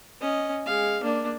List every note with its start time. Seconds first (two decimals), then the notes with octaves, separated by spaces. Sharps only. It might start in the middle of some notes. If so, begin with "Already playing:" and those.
0.21 C#4 D#5
0.66 G#3 F5
1.03 A#3 D4